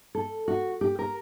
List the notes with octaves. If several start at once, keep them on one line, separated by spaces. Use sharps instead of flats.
A4
F#4
G4
A#4